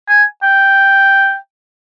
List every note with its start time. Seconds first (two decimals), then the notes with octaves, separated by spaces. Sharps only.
0.08 G#5
0.43 G5